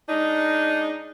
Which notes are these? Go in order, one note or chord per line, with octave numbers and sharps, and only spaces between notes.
G#3 D4 D#4